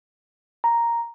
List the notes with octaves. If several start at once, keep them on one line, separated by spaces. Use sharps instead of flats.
A#5